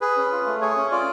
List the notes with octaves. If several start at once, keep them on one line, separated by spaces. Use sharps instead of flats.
G#4 B4
C#4
F4
A3
G#4 C#5
C#4
F4 D5